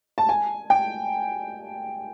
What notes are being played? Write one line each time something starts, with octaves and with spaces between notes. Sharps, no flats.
A5
G#5
G5